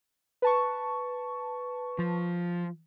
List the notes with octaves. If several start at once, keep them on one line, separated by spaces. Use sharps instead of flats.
B4 A5 C#6
F3